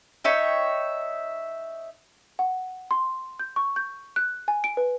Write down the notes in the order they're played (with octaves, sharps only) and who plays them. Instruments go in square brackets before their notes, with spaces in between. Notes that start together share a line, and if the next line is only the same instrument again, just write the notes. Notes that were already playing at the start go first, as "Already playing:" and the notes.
[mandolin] D#4 C#5 E5 G5
[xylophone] F#5
C6
G6
C#6
G6
F#6
G#5
D7
B4